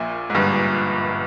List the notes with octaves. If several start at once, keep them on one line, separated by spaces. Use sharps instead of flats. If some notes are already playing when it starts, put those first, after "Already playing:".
Already playing: A#1 A#2
G#2
G1 G2